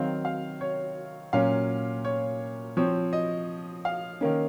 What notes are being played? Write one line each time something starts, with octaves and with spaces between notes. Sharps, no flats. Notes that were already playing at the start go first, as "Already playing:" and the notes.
Already playing: D#3 F#3 C4 F5
F5
C#5
A#2 F#3 C#4 F5
C#5
F3 C4 C#5
D#5
F5
D#3 A#3 C#4